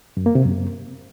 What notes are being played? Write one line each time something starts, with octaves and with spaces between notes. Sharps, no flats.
F#2
A#3
C3
F#2